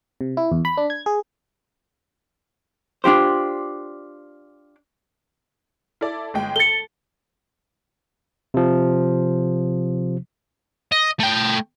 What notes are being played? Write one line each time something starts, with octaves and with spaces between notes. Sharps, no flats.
C3
E4
E2
B5
D4
G#6
G#4
D4 F4 G4 C5
E4 A4 D5
G1 G#3 G5
A4 A6 C#7 G7
C3 F3
D#5
A3 G5